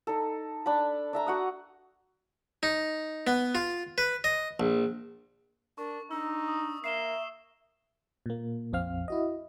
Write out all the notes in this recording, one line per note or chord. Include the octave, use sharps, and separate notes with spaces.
D#4 A4
D4 A5 B5
D4 E5 A#5
F#4 F#5 D#6
D#4
B3
F4
B4
D#5
A#1
D4 A#4 C#6
D4 D#4 E6
D#6
A#3 E5 C7 E7 G7
A#2 A#3
A#1 F2 C4 F5 F6
E4 F#4 D#5